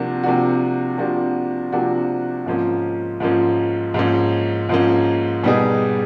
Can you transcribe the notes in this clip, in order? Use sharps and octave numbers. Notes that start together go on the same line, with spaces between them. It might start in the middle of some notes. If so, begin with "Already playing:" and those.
Already playing: C3 F3 A#3 D4 F#4
C3 F3 A#3 D4 F#4
C3 F3 A#3 D4 F#4
C3 F3 A#3 D4 F#4
G#2 F3 A#3 C#4
G#2 F3 A#3 C#4
G#2 F3 A#3 C#4
G#2 F3 A#3 C#4
B2 G3 B3 D#4 G#4